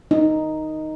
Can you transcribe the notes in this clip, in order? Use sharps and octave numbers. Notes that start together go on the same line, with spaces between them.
D#4